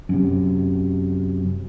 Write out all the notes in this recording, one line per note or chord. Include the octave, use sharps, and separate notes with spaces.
F#2 C3